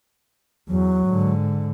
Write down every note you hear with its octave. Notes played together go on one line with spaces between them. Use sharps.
E2 F#3
G#2 D3